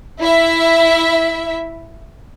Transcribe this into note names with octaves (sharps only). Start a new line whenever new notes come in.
E4 E5